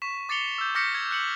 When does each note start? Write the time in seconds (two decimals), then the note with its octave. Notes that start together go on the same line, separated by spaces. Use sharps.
0.02 C#6 B6 E7
0.29 D6 A6 C7 C#7 F7 G7
0.58 E6 G6
0.75 D6 F6 G6 A#6 B6 C#7
0.95 G#6
1.11 F#6 C#7 F#7